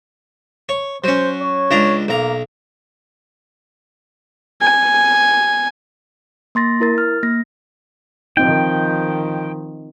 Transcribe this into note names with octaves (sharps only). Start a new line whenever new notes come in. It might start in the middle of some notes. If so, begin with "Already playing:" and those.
C#5
F#3 C#4 C5
C#5
C#2 D4 A#5
B1 A#3 A#5
G#5
A#3 C6 A6 A#6
E4 A#4 A6
F6
A#3 A#6
D#3 F3 C4 D#4 G5